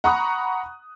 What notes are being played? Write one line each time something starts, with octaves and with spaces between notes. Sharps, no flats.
F#5 A#5 B5 C#6 D#6 F#6